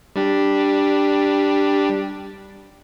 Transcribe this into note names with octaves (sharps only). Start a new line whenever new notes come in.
G3 D4 G4